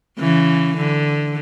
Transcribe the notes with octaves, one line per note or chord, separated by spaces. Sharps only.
C#3 E3
D3